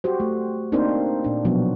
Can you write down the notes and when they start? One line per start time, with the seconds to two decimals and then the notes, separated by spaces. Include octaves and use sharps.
0.04 F#4 G4 C5
0.20 A3
0.72 A#3 C4 D4 D#4 A#4 C5
1.24 A#2 D4
1.45 B2 F3 F#3 B3 D4 F#4